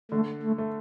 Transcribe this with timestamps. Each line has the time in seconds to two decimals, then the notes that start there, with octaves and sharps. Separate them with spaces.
0.11 D3 A3
0.42 A3
0.58 A3